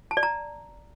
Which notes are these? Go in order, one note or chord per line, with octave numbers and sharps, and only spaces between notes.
A5
D5
A#5